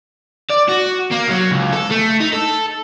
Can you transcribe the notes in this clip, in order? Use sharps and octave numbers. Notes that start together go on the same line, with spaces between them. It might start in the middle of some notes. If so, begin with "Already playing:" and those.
D5
F#4
A#3
F#3
C#2
A4
A3
D#4
A4